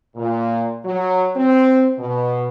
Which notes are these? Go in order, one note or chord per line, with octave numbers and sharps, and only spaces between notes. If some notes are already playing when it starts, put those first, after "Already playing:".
A#2
F#3
C4
B2